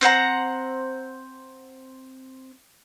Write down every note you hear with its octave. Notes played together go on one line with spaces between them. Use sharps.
C4 C5 F#5 A#5